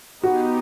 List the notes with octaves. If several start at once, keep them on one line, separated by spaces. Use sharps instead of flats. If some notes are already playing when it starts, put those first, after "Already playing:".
B3 D#4 F#4 G4